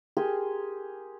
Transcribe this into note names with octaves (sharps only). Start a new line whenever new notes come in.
G4 G#4 A#4 C6